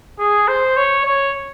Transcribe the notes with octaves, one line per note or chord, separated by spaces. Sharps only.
G#4
C5
C#5
C#5